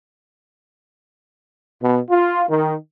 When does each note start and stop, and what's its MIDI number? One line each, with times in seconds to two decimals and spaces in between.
1.82 2.00 47
2.10 2.44 65
2.49 2.76 51